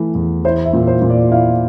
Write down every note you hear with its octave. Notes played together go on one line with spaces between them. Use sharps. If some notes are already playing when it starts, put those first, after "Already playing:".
Already playing: E3 A3
E2
E4 C5
E5
A#2
C5
A#2
D5
E4 F5